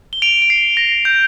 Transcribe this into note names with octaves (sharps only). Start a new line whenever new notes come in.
G7
D7 F7
D7
C7
A#6
G6